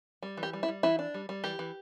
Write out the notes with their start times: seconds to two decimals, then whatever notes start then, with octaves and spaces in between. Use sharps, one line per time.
0.23 G3
0.37 E3
0.43 G4
0.53 G3
0.63 E4
0.68 G3
0.83 E3 E4
0.99 D4
1.14 G3
1.29 G3
1.44 E3 G4
1.59 E3